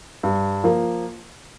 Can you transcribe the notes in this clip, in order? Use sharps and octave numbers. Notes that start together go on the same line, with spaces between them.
G2
F3 A#3